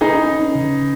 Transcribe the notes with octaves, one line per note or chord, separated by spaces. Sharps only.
D#4 G#4 B4
C#4
C#3